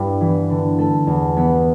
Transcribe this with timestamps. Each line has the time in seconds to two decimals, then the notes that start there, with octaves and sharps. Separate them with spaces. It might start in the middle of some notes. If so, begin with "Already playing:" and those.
Already playing: G2 G3 E4
0.21 E3 B3
0.50 D3
0.78 A3 E4 A4
1.07 E2
1.37 E3 B3 E4